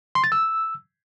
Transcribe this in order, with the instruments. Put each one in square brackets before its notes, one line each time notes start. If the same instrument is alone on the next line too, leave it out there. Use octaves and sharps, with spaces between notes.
[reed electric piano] C6
A6
E6